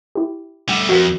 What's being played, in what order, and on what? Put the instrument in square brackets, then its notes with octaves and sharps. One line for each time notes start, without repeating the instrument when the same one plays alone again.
[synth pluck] E4 G4
[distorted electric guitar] G3 A3 [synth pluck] F#5
[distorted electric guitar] F2 [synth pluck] F#4 A#4